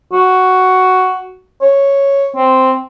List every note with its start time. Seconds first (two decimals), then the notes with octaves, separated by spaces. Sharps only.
0.13 F#4
1.62 C#5
2.36 C4